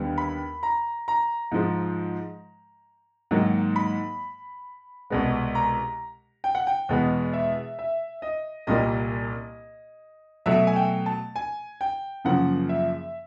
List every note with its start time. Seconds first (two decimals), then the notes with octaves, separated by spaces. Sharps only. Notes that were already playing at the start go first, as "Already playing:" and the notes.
Already playing: D#2 D3 G3 B3
0.18 B5
0.63 A#5
1.08 A#5
1.52 G#2 F3 G#3
3.31 G#2 D#3 F#3 A#3
3.76 B5
5.10 C2 B2 G#3 B3
5.55 A#5
6.44 G5
6.55 F#5
6.67 G5
6.89 E2 B2 G#3 B3
7.33 E5
7.79 E5
8.22 D#5
8.67 C2 A#2 G3 A#3 D#5
10.46 B2 F#3 A3 E5
10.67 G#5
10.76 G5
11.06 A5
11.36 G#5
11.81 G5
12.25 F#2 C#3 F3 A#3 F#5
12.69 E5